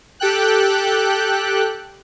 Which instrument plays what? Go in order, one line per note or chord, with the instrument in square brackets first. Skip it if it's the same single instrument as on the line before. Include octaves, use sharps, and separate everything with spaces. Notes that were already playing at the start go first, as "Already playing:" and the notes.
[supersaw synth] G4 A4 G5 F#6